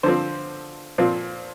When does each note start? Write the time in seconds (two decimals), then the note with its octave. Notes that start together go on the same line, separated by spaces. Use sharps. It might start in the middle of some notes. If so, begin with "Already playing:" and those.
0.03 D3 F3 C4 C5
0.98 A#2 F3 C4